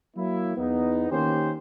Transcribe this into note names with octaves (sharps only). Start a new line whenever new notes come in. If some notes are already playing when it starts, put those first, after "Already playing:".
F#3 A#3 E4
E2 B3 D#4
D#3 A#3 C#4 G4 C5